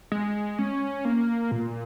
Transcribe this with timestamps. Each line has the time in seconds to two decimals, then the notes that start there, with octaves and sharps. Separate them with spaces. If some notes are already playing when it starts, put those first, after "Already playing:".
0.12 G#3
0.59 C#4
1.05 A#3
1.51 A#2